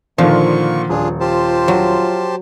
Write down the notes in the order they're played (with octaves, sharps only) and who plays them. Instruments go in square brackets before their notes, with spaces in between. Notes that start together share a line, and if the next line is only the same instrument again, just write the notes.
[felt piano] A#2 D3 D#3 [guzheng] F3 [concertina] A#3 C#6
[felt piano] D#1 [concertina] D4 F4 G#4
[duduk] F4 [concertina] G4 C5 A5
[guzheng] F#3